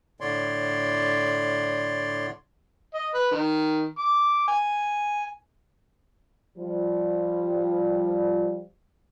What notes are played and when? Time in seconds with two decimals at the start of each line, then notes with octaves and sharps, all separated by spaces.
0.21 A2 D3 C#5 D5 C6
2.94 D#5
3.14 B4
3.31 D#3
3.98 D6
4.48 G#5
6.58 F3 G3